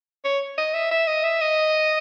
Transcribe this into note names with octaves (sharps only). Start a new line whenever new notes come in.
C#5
D#5
E5
E5
D#5
E5
D#5